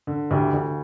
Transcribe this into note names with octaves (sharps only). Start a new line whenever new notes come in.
D3
D2 E4 G4
D2